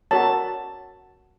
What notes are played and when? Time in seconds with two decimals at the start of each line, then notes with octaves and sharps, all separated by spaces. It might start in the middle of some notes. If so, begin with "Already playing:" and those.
0.11 F#4 A#4 C#5 A5